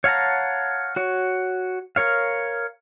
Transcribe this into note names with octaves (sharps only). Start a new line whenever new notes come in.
C#5 F5 F#5 A5 A#5
F#4 C#5
A#4 C#5 F5